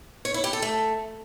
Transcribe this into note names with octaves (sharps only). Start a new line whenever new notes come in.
C#5
E4
G4
A4
A3